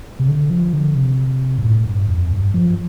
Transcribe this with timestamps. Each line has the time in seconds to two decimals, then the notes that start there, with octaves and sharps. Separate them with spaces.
0.20 C3
0.28 D3
0.50 F3
0.73 D3
0.96 C3
1.58 G2
1.63 A2
1.86 G2
2.09 F2
2.31 G2
2.54 F3